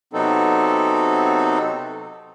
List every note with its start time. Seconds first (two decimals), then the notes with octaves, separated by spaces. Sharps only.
0.13 C3 F#3 B3 C4 D#4 A4